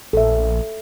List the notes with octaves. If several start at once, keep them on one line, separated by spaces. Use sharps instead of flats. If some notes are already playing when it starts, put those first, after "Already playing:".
A#1 A4 E5